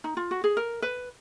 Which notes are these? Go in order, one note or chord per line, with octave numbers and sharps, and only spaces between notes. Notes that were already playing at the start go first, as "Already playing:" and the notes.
D#4
F4
F#4
G#4
A#4
B4